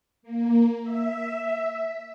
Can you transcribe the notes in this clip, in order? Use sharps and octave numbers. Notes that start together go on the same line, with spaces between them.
A#3
E5